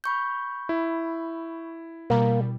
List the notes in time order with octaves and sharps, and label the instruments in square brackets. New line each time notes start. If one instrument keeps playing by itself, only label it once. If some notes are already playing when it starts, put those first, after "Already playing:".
[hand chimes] B5 C#6 G6
[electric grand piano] E4
[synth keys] B2 G3 [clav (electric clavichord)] A#3